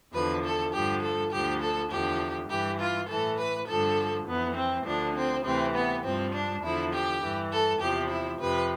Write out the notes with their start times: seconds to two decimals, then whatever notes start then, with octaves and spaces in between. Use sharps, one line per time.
0.13 E2 D3 F3 B4
0.44 A4
0.73 G2 D3 F3 G4
1.02 A4
1.32 D2 D3 F3 G4
1.61 A4
1.91 E2 D3 F3 G4
2.49 G2 E3 G4
2.79 F4
3.08 A2 E3 A4
3.38 B4
3.68 G2 D3 F3 A4
4.27 F2 E3 B3
4.56 C4
4.85 D2 D3 F3 D4
5.15 C4
5.44 D2 C3 E3 C4
5.74 B3
6.04 G2 F3 C4
6.34 D4
6.62 E2 D3 F3 E4
6.92 G4
7.21 G2 E3
7.51 A4
7.81 E2 C3 F3 G4
8.10 E4
8.40 F2 C3 F3 B4